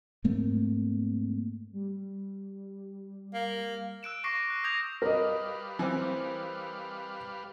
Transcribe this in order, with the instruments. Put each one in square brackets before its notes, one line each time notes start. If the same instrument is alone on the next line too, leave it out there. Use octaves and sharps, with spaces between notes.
[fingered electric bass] G#2 A3 A#3 C4
[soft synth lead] G3
[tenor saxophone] A#3
[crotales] E6 F#6 D7 E7
C#6 D6 A#6 C7 D7
F#6
D#6 G6 G#6 A#6 C7 F7
[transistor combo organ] G3 B4 F5 [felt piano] A#4 D#5
[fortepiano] E3 C4